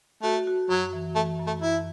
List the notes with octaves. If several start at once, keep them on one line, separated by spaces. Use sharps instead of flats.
A3 F#4
F#4
F#2 F#3
E3
E3 A3
F#2
A3
F#2 E4